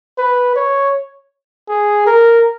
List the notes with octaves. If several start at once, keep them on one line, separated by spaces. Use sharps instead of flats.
B4
C#5
G#4
A#4